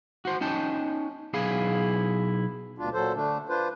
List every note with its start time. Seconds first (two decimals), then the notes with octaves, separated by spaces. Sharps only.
0.25 F#4 C5
0.41 C#4 D#4 G5 A5
1.33 B1 E4 G#4 F5
2.78 D2 B2 D4 F4
2.94 A#2 F#3 A4 C5
3.14 D3 A3 D4
3.49 D4 F4 B4 C5